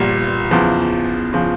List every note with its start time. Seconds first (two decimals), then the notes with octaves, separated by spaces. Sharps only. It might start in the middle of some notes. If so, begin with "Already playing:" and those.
Already playing: A#1 A#2 G3
0.51 E2 C#3 F3
1.33 C#3 F3